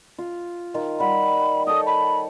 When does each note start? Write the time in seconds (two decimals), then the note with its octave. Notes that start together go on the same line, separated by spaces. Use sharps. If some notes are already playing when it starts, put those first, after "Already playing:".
0.18 F4
0.74 D#3 F4
0.99 G3 F#5 B5
1.67 A4 C#5 G5 D#6
1.87 B5